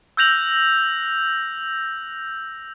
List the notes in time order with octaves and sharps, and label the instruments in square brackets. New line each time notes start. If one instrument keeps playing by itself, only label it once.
[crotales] E6 F#6 G6 A#6 F7 F#7